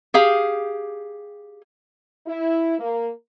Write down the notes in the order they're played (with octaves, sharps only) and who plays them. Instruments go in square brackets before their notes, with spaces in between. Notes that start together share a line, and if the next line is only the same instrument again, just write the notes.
[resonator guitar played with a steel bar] G4 G#4 F5
[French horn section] E4
A#3